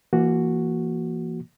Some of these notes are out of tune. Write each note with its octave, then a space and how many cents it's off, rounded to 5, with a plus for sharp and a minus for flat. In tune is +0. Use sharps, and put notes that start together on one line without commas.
E3 +35 A#3 +0 F#4 +0